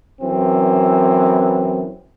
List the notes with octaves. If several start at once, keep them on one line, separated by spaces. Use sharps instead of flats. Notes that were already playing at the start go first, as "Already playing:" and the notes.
F#2 E3 C4